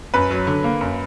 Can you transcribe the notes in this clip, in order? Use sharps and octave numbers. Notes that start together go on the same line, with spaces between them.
F#2 B4
F#3
D3
A#3
F#2